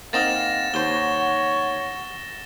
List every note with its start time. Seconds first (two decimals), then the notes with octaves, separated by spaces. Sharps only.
0.13 A#3 C4 D#4 F5 F#5 A6 A#6 E7
0.74 D#2 C5 C#5 G7